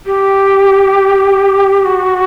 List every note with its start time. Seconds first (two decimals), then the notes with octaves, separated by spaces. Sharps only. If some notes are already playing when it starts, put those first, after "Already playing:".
0.06 G4
1.85 F#4